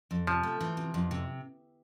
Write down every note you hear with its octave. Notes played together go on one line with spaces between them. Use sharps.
F2
C3 F3
A3
E3
C3
F2
C3